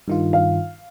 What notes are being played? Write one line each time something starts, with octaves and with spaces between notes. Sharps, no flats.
G2 D#3 F4
F5